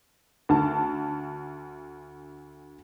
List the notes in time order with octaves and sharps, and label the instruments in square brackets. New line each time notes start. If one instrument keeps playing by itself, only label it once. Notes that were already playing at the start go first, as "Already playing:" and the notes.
[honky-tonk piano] D2 A5